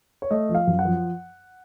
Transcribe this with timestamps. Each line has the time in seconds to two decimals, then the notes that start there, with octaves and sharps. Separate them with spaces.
0.22 C#5
0.31 A3 D#5
0.49 F3
0.55 F5
0.67 F#2
0.79 F#5
0.85 F3